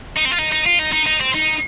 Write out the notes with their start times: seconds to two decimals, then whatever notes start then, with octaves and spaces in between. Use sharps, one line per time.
0.16 D#4
0.25 C4
0.31 F4
0.38 D#4
0.52 D#4
0.66 F4
0.79 D#4
0.92 D#4
1.06 D#4
1.20 C4
1.34 D#4